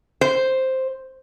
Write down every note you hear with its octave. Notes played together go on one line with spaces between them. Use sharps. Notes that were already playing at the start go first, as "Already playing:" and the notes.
C5